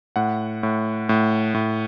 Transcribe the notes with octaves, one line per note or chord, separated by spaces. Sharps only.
A2 F#5
A2
A2
A2